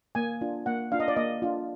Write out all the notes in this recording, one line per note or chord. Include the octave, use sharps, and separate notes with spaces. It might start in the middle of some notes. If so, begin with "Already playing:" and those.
A#3 G#5
D4 F4
A#3 F#5
D4 F4 F5
D#5
D5
A#3 D#5
D4 F4